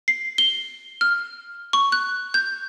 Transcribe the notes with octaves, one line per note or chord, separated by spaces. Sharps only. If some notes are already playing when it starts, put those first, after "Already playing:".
C7
G7
F6
C#6
F#6
G6